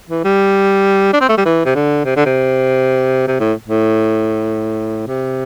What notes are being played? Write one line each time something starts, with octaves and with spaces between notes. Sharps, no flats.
E3
G3
D4
C4
A3
G3
E3
C3
D3
C3
D3
C3
C3
A2
A2
C3